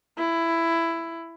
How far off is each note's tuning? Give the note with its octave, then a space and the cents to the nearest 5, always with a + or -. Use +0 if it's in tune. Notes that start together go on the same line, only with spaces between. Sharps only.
E4 +10